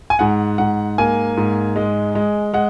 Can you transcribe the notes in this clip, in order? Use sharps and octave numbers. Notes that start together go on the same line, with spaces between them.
G#5
G#2 F#5
G#2 F#5
A#3 G#5
G#2
G#3
G#3
G#3 F#5